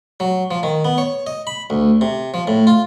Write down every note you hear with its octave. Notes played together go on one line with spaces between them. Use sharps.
F#3
F3
D#3
B3
C#5
D#5
B5
D2
C3
F3
A2
F4